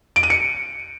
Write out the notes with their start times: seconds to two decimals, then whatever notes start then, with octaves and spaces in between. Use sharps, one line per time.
0.16 D7
0.23 D#7
0.30 C#7